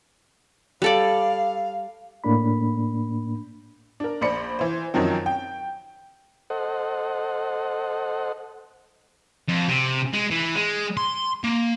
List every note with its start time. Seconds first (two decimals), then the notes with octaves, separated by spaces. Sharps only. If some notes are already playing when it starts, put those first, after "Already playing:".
0.82 G3 A4 D5 F5
2.24 A2 A#3 D4 B5
4.00 D4 A#4
4.21 A#1 C5 D5 B5 C#7
4.59 E3 C5
4.94 F#2 D#3 F3 F#3 C4
5.26 G5
6.50 A4 C5 D#5 F#5
9.48 F2
9.68 C3
10.14 G#3
10.31 E3
10.55 G#3
10.97 C6
11.44 A#3